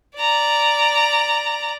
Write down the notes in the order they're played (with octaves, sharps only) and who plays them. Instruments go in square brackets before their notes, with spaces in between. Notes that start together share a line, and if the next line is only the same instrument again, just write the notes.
[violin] D5 A#5